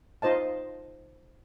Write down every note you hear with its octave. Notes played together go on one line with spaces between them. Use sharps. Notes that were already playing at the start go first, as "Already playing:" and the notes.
D#4 F4 C5 D#5 A5